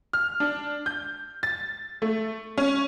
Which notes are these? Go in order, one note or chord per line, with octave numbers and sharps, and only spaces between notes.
F6
D4
G6
A6
A3
C#4